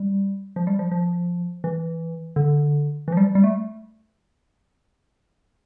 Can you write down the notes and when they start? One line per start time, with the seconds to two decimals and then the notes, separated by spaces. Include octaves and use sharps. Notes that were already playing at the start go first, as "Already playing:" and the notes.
Already playing: G3
0.56 F3
0.67 G3
0.79 F3
0.92 F3
1.64 E3
2.36 D3
3.08 E3
3.12 F3
3.17 G3
3.35 G3
3.44 A3